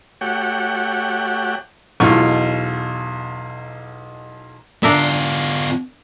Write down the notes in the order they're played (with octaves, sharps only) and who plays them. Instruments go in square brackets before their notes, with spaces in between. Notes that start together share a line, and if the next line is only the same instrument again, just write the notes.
[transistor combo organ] A3 F#4 G4 C#5 F#5 G5
[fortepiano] B1 E2 B2 F4 C#6
[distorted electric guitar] B3 F4 [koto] D4 A#4 E5